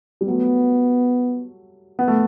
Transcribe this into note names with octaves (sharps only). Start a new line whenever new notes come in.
G3
F#3 A3 B3
B3
A3